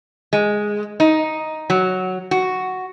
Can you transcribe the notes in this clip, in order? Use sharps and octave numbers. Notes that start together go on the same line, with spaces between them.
G#3
D#4
F#3
F#4